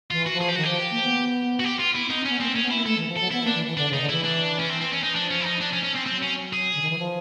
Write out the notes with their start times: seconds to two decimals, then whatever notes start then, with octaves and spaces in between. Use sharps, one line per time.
0.11 E3 F4
0.26 F#4
0.34 F3
0.41 G#4
0.49 G4
0.56 D#3 F#4
0.64 F3 G4
0.91 A#3
1.02 B3
1.60 F#4
1.64 G4
1.79 F4
1.94 B3 E4
2.06 C4
2.10 D#4
2.17 C4
2.25 B3 C#4
2.40 A#3 C4
2.52 A#3
2.56 C#4
2.63 B3
2.71 A#3 E4
2.86 A3 A4
2.97 E3
3.08 F3
3.17 F#3 A4
3.31 B3 E4
3.43 A#3
3.47 D4
3.55 E3
3.67 E3
3.77 D3 D4
3.89 C#3
3.93 D#4
4.01 D3
4.09 E3 E4
4.24 D4
4.59 C#4
4.69 C4
4.81 C4
4.92 C#4
5.03 D#4
5.15 F3 D4
5.30 C#4
5.40 E4
5.46 D#4
5.61 D4
5.73 C#4
5.84 C#4
5.96 C4
6.07 F#3 C4
6.23 C#4
6.53 G#4
6.75 D3
6.82 D#3
6.90 E3
6.99 F3